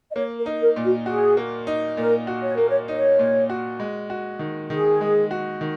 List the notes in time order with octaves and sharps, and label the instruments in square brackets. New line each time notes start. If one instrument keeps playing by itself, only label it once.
[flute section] D#5
[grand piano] A#3 [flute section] C#5
[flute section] A#4
[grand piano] D#4
[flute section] A#4
[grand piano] A#2
[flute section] F#4
[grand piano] F#4 [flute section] G#4
[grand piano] A#3
D#4
[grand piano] A#2 [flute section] A#4
[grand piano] F#4
[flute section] C#5
[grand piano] A#3 [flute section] A#4
[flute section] C#5
[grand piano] D#4 [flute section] C#5
[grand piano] A#2
F#4
G#3
F#4
D#3
[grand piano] D#3 [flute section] G#4
[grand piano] G#3
F#4
D#3